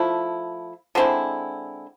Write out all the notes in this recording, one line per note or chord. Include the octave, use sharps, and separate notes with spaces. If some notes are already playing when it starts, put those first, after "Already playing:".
Already playing: F3 A3 E4
D3 G#3 C4 E4